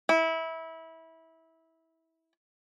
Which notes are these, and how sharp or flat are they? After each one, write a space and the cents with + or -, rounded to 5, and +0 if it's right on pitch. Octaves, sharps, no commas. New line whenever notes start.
E4 -20